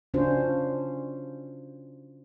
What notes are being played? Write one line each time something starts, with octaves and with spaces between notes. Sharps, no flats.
C#3 C#4 D4 F4 F#4 C5